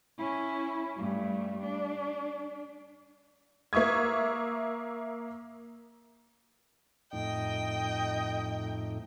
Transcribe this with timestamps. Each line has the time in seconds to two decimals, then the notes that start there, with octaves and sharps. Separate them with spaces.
0.18 C#4 E4
0.96 G2 A3
1.63 D4
3.73 A#3 E5 C#6 D#6 G#6
7.13 F2 A2 D#4 D#5 G5